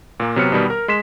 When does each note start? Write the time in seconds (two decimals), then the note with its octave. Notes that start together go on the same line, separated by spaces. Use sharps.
0.20 A#2 A#3
0.36 C3 F#3 B3 F6 C#7
0.52 B2 D#3 G3 B3
0.70 A#4 F6
0.88 G#3 C6 B6 E7